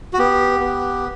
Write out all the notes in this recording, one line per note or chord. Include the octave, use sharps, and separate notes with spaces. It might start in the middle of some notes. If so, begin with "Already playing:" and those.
F#4
B3 G4
B3